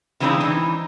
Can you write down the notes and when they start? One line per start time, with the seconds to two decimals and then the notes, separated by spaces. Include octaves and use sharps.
0.20 C#3 E3 G#3 C4 D4 D#4
0.41 E3 D#4